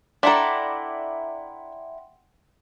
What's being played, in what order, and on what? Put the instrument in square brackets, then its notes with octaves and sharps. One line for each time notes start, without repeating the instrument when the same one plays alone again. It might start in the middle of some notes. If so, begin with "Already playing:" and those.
[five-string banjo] D4 A4 [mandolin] E4 D5 A#5 [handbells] F#5 G5 C6